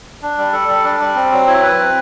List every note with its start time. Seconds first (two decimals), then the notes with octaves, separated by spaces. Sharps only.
0.22 D4
0.38 G3
0.53 A4
0.68 G3
0.84 D4
1.00 G3
1.15 C4
1.32 F#3
1.47 E4
1.63 B4
1.79 C4